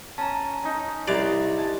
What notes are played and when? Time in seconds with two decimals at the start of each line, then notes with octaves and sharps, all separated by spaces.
0.18 C#4 A5 A#5
0.63 C#4 D#4
1.08 C2 G4 B4 D5 A#5 C6
1.57 G#5 A5